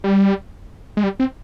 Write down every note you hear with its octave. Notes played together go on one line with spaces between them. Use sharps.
G3
G#3
G3
C4